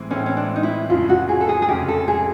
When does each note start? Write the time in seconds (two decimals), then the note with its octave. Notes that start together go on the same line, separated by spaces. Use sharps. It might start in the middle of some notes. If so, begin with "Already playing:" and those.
Already playing: A2 E3 G#3 C4
0.11 A2 E3 G#3 C4 C#4
0.26 C#4
0.37 D4
0.56 D#4
0.63 E4
0.89 F1 F2 C#3 F4
1.09 F#4
1.29 G#4
1.41 A4
1.49 G#4
1.62 G#4
1.68 F1 F2 C#3 G4
1.88 A4
2.08 G#4